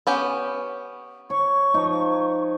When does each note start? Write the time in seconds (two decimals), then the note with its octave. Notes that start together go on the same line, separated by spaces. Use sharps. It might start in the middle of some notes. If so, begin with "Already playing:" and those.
0.07 B3 C#4 G4
1.30 C#5 C#6
1.74 F3 D#4